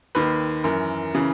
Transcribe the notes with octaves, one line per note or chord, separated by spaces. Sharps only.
D#2 D#3 B4
F#2 E3 A#4
C#3 E3